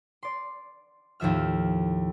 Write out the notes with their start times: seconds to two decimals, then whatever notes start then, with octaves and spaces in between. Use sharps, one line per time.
0.23 D5 C6
1.20 D#2 A2 F3 E5 F6